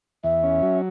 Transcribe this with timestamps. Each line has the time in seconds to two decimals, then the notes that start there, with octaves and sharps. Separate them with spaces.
0.24 E2 E5
0.43 C#4
0.62 F#3